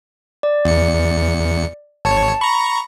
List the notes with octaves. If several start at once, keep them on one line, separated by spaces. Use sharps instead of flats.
D5
E2 C#7
G#1 C#5 A5 C#7
A#5 B5 C#6